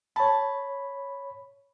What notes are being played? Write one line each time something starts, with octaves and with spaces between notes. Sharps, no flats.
C#5 A5 B5